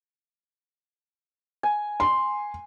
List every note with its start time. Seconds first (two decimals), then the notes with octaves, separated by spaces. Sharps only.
1.63 G#5
2.00 C6